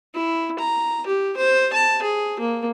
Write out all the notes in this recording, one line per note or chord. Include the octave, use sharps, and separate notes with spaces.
E4
A#5
G4
C5
A5
G#4
A#3